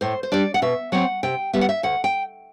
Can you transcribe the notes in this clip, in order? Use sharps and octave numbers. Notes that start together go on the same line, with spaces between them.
A2 C5
C5
G3 D4 D5
F#5
B2 E5
F#3 C4 F#5
C3 G5
G3 B3 E5
F#5
E5
D2 F#5
G5